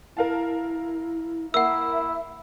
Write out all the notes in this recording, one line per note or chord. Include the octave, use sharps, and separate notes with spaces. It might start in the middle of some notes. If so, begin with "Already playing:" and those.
E4 A#4 F5 A5
A#3 E4 E5 F#5 E6